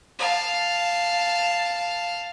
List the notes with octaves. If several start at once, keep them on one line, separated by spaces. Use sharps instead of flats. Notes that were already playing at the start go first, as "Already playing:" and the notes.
F5 A5